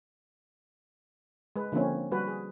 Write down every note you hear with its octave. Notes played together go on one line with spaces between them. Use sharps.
G#3 B4
D3 F3 A#3 C4 C#4
G3 F#4 B4
G#4